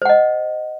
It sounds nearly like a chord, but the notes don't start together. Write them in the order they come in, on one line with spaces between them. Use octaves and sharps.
C5 F#5 D#5